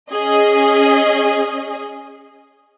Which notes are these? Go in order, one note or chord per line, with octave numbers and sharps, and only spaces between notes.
C#4 G#4 D#5